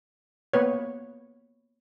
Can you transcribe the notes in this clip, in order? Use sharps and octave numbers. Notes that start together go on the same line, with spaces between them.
A#3 B3 B4 C#5